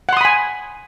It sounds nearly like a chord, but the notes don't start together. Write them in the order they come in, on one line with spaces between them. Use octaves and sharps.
F#5 C6 D#6 B5 G#5